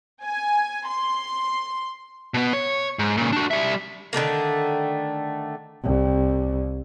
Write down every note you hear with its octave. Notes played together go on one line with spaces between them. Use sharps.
G#5
C6
B2 B3
C#5
G#2
A#2 C#3
D4 F#4
G3 E5
D3 D#3 A3 A#3
C2